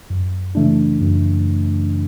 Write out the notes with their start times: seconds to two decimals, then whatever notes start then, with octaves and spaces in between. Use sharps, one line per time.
0.10 F#2
0.55 C#3 E3 A3 D4
1.01 F#2